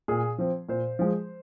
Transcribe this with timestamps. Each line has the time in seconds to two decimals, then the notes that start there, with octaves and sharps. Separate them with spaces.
0.08 A#2 G#4
0.38 F3 C4
0.69 A#2 C5
0.99 F3 G#3